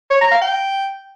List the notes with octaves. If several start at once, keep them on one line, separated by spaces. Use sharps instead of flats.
C#5
A#5
F5
G5